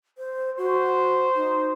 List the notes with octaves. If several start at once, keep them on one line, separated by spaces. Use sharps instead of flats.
C5
F#4 C5
D#4